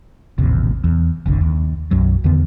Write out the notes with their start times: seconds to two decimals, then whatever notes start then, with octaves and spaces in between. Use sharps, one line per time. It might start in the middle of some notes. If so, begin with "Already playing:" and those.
0.38 D#1 A1 D#2 C3
0.84 E2
1.26 F#1 C2 D3
1.41 D#2
1.91 B1 F#2 F#3
2.24 E2 D3 D#3 B3